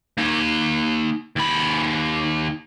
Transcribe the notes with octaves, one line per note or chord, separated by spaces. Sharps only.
A#3 D#4
D#2 B5